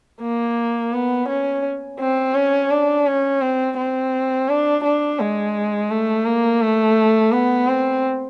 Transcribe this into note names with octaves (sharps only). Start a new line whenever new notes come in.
A#3
B3
C#4
C4
C#4
D4
C#4
C4
C4
D4
D4
G#3
A3
A#3
A3
B3
C4